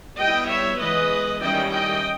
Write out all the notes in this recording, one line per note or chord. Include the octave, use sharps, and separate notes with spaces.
G3 B3 E4 D#5 G5
C#5 E5
E3 G#3 B3 B4 D#5
D#3 G3 C#4 E4 D#5 G5
D#5 G5